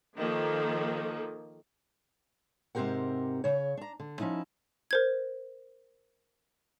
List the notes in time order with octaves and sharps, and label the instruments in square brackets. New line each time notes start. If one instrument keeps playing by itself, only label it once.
[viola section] D#3 F3 A#3 A4
[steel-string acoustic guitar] G#2 C3 C4 G4 A#4 F#5
C#3 C#5
D4 A#5
D3
F3 C#4 D#4 E4
[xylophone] A#4 C5 G#6